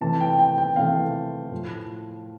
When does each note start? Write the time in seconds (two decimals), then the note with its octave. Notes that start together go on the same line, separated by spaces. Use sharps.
0.01 C3 E3 A3 A5
0.20 G5
0.39 G5
0.58 G5
0.76 C3 E3 A3 F5
1.51 A2 F3 A3